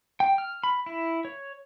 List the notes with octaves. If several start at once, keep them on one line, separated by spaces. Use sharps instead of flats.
G5
F6
B5
E4
C#5